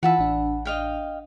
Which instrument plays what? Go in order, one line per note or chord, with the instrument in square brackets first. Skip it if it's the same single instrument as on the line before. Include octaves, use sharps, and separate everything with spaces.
[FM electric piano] E3 F4 E6 [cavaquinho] F#5 A5 B5
[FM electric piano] A1 D4
[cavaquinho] D#5 F5 G5